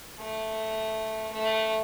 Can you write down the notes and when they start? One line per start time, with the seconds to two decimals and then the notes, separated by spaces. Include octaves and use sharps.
0.19 A3
1.32 A3